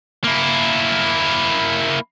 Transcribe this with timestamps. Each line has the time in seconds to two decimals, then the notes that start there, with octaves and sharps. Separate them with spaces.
0.24 A#3 E4